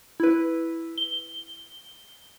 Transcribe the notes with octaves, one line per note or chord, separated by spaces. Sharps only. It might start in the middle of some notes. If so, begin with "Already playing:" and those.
E4 B4
G7